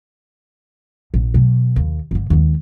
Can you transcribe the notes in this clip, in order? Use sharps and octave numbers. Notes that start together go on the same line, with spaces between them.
A#1
B2 F#3
D#2
G1 D3
D#2 G#3